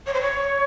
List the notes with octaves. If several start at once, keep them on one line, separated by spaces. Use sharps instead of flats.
C#5
C5
C#5